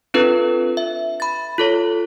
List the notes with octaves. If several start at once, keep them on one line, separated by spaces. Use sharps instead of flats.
C4 D4 F4 A4 B4
E5
B5 A6
F4 A4 C#5